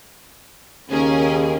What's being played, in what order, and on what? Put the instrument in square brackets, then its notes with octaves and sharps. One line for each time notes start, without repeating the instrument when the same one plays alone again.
[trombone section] D#2 C#3 [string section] C#4 G#4 A#4